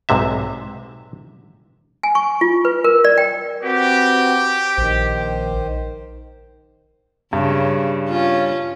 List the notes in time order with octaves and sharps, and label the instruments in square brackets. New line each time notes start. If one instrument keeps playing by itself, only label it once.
[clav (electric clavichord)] B1 G#2 C3 E5
[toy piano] G#5
C#6
F4
B4
A#4
D5
G5
[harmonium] C4 F#4 B4 [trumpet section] G4
[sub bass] A#1 [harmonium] D#3 C5
[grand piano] G2 [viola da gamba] C#3
[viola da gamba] C#4 F4